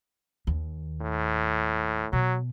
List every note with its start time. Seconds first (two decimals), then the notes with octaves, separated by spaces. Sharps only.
0.47 D#2
1.01 A2
2.13 B2 F#3